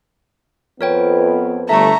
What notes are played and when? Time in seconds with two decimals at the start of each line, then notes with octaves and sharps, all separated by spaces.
0.81 F2 B3 A#4 B4 C#5 G5
1.69 G1 A3 E5 A5 A#5 C#6